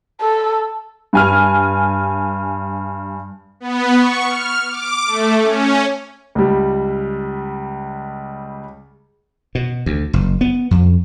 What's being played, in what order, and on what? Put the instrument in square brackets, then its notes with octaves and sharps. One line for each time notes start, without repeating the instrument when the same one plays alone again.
[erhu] A4
[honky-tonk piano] G2 G#5 F6
[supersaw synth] B3
C#6
F6
D6
A3
C#4
[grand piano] C#2 G3
[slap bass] B2
D2
F#1
B3
F2